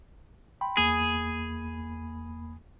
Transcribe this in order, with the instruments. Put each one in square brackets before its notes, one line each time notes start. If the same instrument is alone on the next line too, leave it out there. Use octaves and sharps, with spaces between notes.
[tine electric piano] G5 B5 C6
[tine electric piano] E2 A#3 B5 [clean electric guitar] G#4